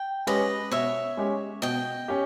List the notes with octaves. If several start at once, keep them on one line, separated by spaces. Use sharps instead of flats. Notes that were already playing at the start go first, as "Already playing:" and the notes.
Already playing: G5
G#3 C#4 G4 B4 D#5
B2 C#5 E5
G#3 C#4 G4
B2 D#5 G5
C#4 G4